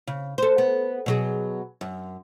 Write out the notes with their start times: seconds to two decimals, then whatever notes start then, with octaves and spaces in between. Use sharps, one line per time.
0.07 C#3
0.38 A4 C5
0.58 B3
1.06 B2 F#3 G#4
1.81 F#2